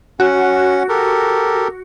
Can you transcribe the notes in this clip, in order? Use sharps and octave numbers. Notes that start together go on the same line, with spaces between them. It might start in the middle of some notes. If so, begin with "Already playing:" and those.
C#4 F#4 F#5
G4 A4 A#4